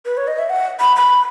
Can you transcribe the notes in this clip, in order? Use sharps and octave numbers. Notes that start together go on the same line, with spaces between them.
B4
C#5
D#5
E5
F#5
B5
B5